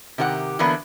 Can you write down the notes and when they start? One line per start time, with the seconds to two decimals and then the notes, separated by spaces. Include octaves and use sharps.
0.18 C3 D#3 G4 C#5 F#5
0.59 D3 E3 F#3 A#3 B3 D4